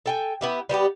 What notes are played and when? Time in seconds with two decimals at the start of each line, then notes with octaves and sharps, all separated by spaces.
0.06 A4 G5 G#5
0.41 B3 E4 G4
0.69 G3 B3 F#4 G4